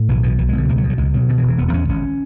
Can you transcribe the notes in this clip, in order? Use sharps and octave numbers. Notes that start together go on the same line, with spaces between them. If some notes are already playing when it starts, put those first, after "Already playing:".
Already playing: A2
B1 E3
B2 E3
B1 E3
G#3
B2
D3
C#2 E3
F#3
B2
F#3
C#2 G#3
B2 F#3
B2 D3
E3
E1
E3
E1 B3
B3
E2 C#4
G#1 C#4